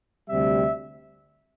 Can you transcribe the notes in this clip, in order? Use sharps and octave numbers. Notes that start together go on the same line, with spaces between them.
D2 C3 G3 E5